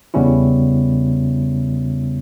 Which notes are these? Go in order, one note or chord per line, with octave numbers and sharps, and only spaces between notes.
E2 C#3 G3 B3 C#4 E4